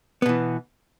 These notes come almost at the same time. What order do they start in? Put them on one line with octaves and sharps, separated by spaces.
B3 B2 E3